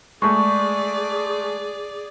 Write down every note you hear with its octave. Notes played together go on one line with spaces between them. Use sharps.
G#3 A3 G#4 D5 C#6